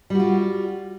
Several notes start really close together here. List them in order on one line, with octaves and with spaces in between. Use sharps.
G3 F#4 F4